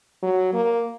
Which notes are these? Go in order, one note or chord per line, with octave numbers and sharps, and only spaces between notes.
F#3
A#3